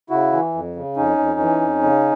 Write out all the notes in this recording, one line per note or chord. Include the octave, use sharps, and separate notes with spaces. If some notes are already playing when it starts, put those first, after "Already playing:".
C#3 E4 F#4
E3
F2
C#3
F2 C#4 D#4
F2
E3
F2
C#3